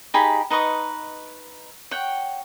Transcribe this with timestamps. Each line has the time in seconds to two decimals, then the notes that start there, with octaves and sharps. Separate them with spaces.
0.14 D#4 G4 G#4 B5
0.50 D#4 B4 D#5 C#6
1.91 C#5 F#5 G5